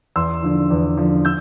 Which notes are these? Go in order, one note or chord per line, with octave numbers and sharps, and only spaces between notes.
E2 C6 E6
D3 F3
E2
D3 F3
E6 G6